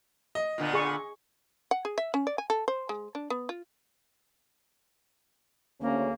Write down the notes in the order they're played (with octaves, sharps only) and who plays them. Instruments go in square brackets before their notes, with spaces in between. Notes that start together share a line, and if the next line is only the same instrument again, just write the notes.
[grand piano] D#5
[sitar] A#2 D3 B3
[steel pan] G#4 C#6
[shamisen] F#5
G#4
E5
C#4
D5
G#5
A4
C5
G#3
D4
B3
F4
[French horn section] D2 C#3 C#4 [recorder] A#3